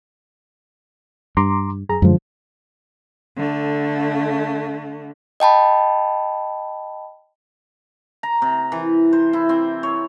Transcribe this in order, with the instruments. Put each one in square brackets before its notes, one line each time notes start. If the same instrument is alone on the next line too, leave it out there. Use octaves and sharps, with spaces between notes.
[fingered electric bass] G2 [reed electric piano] A#5 C6 D6
[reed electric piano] F#2 G#4 A#5
[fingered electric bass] F#2 G#3 [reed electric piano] D3 F3
[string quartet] D3 A3
[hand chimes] D#5 G5 A5 B5
[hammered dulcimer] A#5
C3
E3
C5
E4
C4
C#5